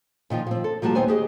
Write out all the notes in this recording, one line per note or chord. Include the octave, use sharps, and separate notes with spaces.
A#2 D#3 F3 F4
F3 C4
A4
F3 G3 A#3 F#4 A5
D#2 D#3 B3 C4 C5 G#5
G4 G#4 D#5